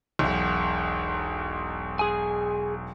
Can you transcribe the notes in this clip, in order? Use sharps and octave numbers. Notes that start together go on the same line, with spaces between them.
E1 B1
G#4 G#5